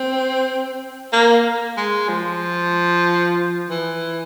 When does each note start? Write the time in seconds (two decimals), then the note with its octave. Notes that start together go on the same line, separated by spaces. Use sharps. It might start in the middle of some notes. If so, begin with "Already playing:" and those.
Already playing: C4
1.13 A#3
1.77 G#3
2.09 F3
3.69 E3